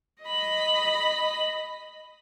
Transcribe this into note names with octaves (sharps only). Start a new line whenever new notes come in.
D#5 B5